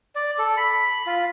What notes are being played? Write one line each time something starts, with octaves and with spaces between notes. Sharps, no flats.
D5
A4
B5
F4